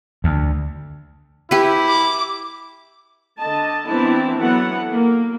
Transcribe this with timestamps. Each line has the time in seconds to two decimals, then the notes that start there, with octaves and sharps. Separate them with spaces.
0.24 D2
1.51 E4 G4 B4
1.89 D6
3.39 D3 D#5 A5
3.87 E3 B3 C4 D4 E4 A5
4.38 E3 F#3 B3 A4 F#5
4.91 A#3